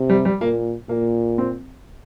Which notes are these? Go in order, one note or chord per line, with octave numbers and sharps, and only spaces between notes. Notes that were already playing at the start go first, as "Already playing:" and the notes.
Already playing: C3
G3
G3
A#2 A#3
A#2 A#3
C4